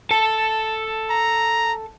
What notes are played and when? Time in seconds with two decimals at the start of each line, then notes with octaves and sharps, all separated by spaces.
0.11 A4 A5
1.10 A#5